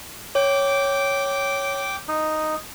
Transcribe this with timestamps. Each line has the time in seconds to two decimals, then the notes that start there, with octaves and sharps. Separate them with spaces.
0.35 C#5 G5 D6
2.08 D#4